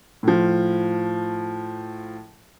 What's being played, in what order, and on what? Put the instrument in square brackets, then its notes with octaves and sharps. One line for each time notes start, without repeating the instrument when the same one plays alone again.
[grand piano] A2 F3